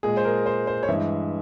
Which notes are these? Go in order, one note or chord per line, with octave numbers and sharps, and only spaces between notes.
A#2 G#3 G#4
C5
A#4
C5
C5
C#5
G2 E3 G#3 E5